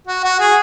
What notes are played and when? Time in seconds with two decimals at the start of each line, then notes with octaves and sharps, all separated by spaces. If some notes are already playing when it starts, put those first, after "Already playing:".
0.07 F#4
0.24 F#4
0.40 G#4